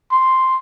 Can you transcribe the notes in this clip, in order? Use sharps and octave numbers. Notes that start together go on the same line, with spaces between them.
C6